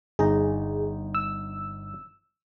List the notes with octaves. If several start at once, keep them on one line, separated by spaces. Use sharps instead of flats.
G1 D#4 G#4 A#5
E6